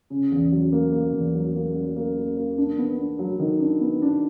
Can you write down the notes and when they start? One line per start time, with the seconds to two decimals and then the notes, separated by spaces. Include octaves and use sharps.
0.10 C#3
0.32 E2
0.52 F#3
0.72 A#3
0.92 A#3
1.13 E2
1.34 F#3
1.55 A#3
1.75 F#3
1.96 A#3
2.17 A#3
2.37 A#3
2.58 D4
2.78 B3
2.98 D4
3.19 F#3
3.39 D#3
3.60 D4
3.80 B3
4.02 D4